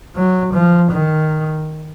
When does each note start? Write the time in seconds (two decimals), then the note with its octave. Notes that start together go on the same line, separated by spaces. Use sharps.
0.16 F#3
0.53 F3
0.91 D#3